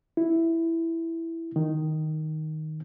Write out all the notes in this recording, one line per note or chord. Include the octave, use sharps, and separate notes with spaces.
E4
D#3